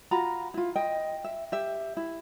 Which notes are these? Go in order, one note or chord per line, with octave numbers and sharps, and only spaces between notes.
F4 F#4 A#5 B5
E4 F4
D#5 G5
E5
G4 E5
E4